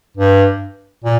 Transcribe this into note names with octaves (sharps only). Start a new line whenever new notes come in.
G2
A#2